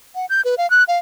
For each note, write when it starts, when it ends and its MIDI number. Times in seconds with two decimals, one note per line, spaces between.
0.15 0.26 78
0.29 0.41 91
0.45 0.55 71
0.58 0.69 77
0.70 0.84 90
0.88 0.98 77